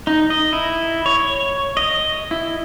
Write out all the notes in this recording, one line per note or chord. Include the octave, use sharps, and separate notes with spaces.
D#4
D#5
E4
C#5
D#5
E4